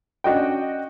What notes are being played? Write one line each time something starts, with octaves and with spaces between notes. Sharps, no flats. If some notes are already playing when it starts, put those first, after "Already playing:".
C#4 D4 F#4 D#5 G5